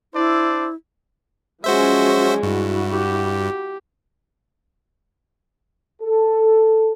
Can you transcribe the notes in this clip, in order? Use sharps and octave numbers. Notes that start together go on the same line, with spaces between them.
D4 E4 C5 D5
F3 F#3 G#3 C#4 F#4 C5 E5
G2 E4 F#4
G4
A4